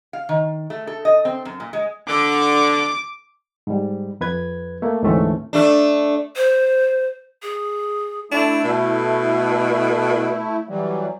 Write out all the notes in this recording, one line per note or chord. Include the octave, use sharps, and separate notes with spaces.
F5
D#3
A3
A4
D#5
C4
F#2
A#2
G#3
D3 D6
G#2 G3
F2 B4 G#6
A3 A#3
D2 G#2 E3 A3 C4 C#4
A3 D4
C5
G#4
A3 D4 E4
B2
E3 F#3 G3